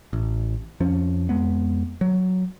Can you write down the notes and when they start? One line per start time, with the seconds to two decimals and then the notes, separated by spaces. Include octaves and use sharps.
0.13 A1
0.80 F2 F3 C#4
1.29 F2 G#3 B3
2.01 F#3